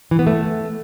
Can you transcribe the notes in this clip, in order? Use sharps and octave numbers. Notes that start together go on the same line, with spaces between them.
E3
B3
A3